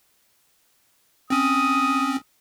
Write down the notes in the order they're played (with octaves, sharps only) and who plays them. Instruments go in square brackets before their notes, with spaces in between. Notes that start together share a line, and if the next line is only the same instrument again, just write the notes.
[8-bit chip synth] C4 C#4 [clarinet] D#6